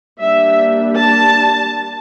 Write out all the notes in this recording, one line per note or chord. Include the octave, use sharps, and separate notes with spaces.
G3 A#3 D4 E5
A5